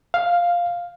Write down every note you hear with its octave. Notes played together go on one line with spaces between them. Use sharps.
F5